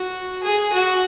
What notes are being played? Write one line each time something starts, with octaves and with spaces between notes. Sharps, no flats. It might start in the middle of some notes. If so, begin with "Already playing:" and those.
Already playing: F#4
G#4
F#4